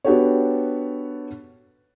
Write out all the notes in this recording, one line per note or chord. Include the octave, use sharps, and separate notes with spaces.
B3 D4 F#4 G4 A4 C#5